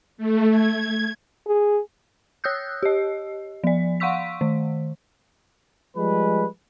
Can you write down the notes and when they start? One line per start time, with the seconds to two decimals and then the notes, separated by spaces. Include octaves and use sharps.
0.17 A3
0.50 G#6
1.47 G#4
2.44 C#5 D#6 E6 F#6 G6
2.83 G4 D#5
3.64 F3 D5
4.00 F5 F#5 C6 C#6 E6 B6
4.41 D#3
5.96 F3 G3 G#3 B4